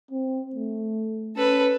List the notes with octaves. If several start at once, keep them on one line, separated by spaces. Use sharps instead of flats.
C4
A3
C#4 A4 B4